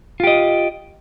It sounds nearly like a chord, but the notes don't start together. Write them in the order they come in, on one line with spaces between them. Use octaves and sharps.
F4 G4 D#5